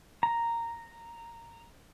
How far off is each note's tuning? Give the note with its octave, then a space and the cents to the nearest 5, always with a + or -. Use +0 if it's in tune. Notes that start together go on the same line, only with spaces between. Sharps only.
A#5 -5